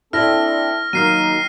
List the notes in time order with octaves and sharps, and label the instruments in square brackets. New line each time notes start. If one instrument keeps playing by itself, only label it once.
[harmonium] C4 D4 A4 [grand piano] E4 [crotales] F6 A#6
[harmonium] D#3 A#3 D#4 [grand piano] F#3 [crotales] F6 C7 D#7